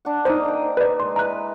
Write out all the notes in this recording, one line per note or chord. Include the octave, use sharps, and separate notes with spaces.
D4 F#5
A#3 D#4 C5 D#5
G5 A#5
B4 D5
G#3 C6
E4 B4 A#5 F#6